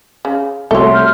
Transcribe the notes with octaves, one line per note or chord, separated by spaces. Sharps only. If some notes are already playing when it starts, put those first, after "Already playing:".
C#3
C2 A3 F#4 A4 C#5 E5 C6
F6 G6